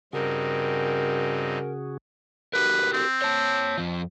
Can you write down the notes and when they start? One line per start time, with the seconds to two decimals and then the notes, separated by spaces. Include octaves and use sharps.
0.13 G2 C#3 C4 D#4 F#4 G#4 A#4
2.53 F#4 G4 A#4 B4
2.93 C4
3.22 C#5 A5
3.78 F2 F3